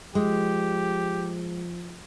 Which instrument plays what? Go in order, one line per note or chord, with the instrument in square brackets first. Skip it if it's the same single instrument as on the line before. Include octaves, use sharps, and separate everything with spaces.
[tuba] F3 [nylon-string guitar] G#3 [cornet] G4